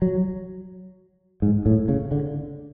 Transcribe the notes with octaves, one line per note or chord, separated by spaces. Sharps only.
F#3
G#2
A2
C#3
D3